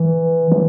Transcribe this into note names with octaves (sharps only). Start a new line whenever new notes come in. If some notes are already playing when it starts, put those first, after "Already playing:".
Already playing: E3
E3